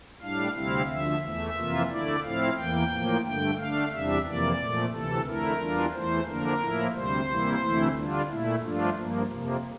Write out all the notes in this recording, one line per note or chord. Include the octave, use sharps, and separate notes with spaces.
A2 G3 D4 F5
D2 C3 G3 C4 E4 F5
D2 D3 F3 E5
E2 E3 A3 E5
F2 C3 E3 A#3 F4
D2 D3 A3 E4 D5
A2 F3 C4 E4 F5
E2 E3 A#3 G5
A2 F3 A#3
G2 D3 A3 G5
D3 A3 D4 F5
E2 C3 G3 D4 E5
F2 C3 E3 A#3 D5
A#2 F3 A3
D2 C3 E3 A4
F2 D3 A3 E4 A#4
E2 E3 G3 D4 F4
E2 E3 A3 C5
F2 D3 F3 A#3 D4 A#4
A2 F3 A#3 E4
D2 C3 G3 C5
C3 E3 G3 A#3 E4
D2 C3 E3 A3 E4
D3 G3 D4 F4
A#2 A3 E4
G2 F3 A3 D4 F4
G2 F3 A#3
F2 C3 F3 A#3